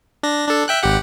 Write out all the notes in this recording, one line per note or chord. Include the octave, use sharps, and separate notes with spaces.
D4 A#6
D4 A4
E5 G5 F#6
G#1 G4 F#5